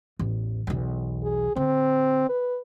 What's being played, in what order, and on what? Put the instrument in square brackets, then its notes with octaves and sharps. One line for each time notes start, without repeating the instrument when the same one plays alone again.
[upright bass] A1 E2
B1 E2
[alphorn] G#4
[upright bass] D3 [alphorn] C4
[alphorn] B4